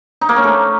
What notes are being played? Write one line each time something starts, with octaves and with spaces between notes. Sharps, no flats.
D#4
A#3
C#4
A3